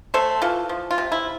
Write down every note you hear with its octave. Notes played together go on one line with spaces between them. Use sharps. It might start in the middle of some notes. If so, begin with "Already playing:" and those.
A3 A4 C5
E3 F4 A4
F3
F4
C3
E4